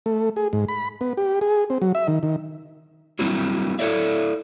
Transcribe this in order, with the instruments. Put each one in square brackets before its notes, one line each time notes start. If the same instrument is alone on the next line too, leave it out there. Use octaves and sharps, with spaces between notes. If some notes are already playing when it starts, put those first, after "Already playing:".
[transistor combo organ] A3
G#4
G#2
B5
B3
G4
G#4
C4
F#3
E5
D#3
D#3
[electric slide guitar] F#3 G3 A#3 C4 E4
E4 A4 C#5 D5 E5